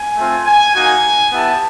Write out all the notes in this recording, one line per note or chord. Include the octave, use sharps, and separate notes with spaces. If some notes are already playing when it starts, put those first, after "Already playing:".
Already playing: G#5
A3 C4 F4
G#5
A#3 D#4 F#4 G#5
B3 E4 G4 A5